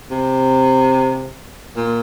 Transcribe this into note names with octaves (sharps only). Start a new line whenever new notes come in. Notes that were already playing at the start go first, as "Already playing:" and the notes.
C3
A#2